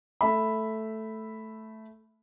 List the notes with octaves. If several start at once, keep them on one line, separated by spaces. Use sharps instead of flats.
A3 E5 B5